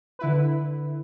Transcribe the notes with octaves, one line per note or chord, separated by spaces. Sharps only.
D3 E4 B4